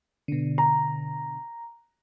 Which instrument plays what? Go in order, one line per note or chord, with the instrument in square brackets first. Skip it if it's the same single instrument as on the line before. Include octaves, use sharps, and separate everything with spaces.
[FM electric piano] B2 D3
[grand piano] A#5